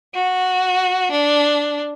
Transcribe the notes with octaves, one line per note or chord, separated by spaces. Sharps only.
F#4
D4